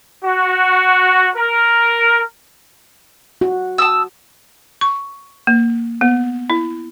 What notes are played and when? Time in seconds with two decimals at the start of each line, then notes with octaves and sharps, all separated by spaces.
0.25 F#4
1.36 A#4
3.41 F#4
3.78 A5 D#6 E6
4.81 C#6
5.47 A#3
6.01 B3
6.50 E4